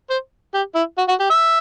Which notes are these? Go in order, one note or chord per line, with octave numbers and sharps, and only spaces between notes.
C5
G4
E4
F#4
F#4
G4
E5